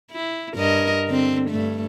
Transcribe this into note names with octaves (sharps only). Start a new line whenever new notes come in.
E4
G2 A#4 D#5
D3 C4
G2 A3